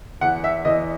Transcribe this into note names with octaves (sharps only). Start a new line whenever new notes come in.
E2 F#5
E5
E2 D#5